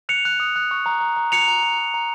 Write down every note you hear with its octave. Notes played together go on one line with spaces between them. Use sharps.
F#6 C#7 F7
F#6
D#6
F#6
C#6
A#5
A#5
A#5
A#5 C#7 F7
A#5
A#5
A#5
A#5